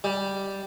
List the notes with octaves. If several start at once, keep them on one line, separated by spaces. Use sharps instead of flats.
G3